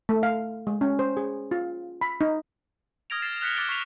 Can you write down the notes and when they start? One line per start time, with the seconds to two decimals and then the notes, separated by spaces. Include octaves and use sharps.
0.09 A3
0.23 F5
0.67 G#3
0.81 C#4
0.99 C5
1.17 G#4
1.51 F4
2.01 B5
2.21 D#4
3.10 D#6 F6 G#6 A#6 D7 F7
3.22 A6 C7 E7
3.41 F6 F#6 B6 C#7 G7
3.56 D6 F#6 A6 D7 G7
3.69 C#6 B6 C7 E7 F7